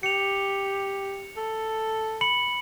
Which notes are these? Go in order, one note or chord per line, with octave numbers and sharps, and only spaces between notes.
G4 C#7 F7
A4
B5 C#7 F#7